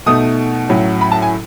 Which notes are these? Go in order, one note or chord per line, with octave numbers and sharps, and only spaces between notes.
B2 A3 D#4 D#6
A2 F#3 C#4
B5
A5
G#5